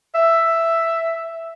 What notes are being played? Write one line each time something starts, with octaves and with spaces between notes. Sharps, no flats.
E5